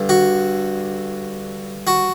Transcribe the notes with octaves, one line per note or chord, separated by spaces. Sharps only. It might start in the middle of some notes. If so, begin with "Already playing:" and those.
Already playing: G2 D3
F#4
F#4